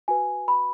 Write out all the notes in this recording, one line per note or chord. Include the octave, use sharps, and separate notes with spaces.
F#4 B4 G#5
B5